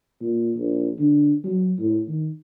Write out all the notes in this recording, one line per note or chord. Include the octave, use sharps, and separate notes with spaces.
A#2
A#1
D3
F#3
A2
D#3